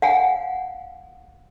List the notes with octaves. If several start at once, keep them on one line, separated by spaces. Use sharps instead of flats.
F5 F#5 G#5